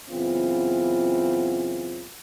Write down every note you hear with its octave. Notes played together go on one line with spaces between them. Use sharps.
F#2 C#3 E3 B3 C4 F4